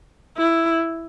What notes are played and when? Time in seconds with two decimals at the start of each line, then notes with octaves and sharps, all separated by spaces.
0.37 E4